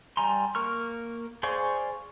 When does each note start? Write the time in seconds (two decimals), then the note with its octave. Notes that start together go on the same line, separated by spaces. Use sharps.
0.17 G3 G#5 A#5 C6
0.55 A#3 A#4 C#6 F6
1.43 G#4 C5 D5 F5 C#6